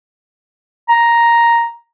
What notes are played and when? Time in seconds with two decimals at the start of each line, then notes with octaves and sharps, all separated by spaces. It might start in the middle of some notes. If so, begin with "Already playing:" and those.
0.89 A#5